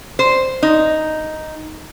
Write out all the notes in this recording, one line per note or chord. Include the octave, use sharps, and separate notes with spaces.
C5
D#4